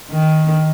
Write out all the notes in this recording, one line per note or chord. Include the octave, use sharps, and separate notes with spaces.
D#3